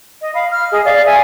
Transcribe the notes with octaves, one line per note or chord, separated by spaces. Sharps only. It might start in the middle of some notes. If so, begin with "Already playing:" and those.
D#5
F5 B5
F6
G#4 D#5
D5 F5
E5 G#5